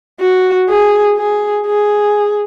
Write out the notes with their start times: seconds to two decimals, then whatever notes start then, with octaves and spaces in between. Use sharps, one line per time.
0.20 F#4
0.69 G#4
1.17 G#4
1.67 G#4